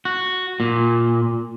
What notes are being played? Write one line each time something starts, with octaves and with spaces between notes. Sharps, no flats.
F#4
A#2